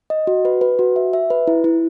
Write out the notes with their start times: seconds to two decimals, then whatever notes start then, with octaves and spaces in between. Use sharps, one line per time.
0.10 D#5
0.27 F#4
0.45 B4
0.61 B4
0.79 F#4
0.96 E5
1.13 E5
1.30 B4
1.47 E4
1.64 E4